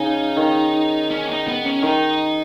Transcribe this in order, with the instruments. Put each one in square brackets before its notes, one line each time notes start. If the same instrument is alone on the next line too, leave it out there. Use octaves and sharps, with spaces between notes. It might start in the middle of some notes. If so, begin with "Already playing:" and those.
Already playing: [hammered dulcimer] C#3 [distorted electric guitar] D#4
[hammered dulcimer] D#3
[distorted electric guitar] C#4
D#4
B3
C#4
[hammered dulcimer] D#3 [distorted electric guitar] D#4